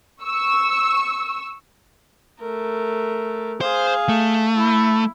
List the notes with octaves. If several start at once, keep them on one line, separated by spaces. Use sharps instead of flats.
C#6 E6
A3 A#4
G#4 C5 F5
A3
E4